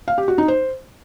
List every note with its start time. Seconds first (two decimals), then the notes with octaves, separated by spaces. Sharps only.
0.08 F5
0.18 G4
0.28 F#4
0.38 D#4
0.48 C5